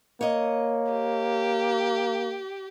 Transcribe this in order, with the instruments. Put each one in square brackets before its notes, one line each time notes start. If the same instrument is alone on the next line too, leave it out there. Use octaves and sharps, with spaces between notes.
[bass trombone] A#3 [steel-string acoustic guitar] C#5 D#5
[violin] G4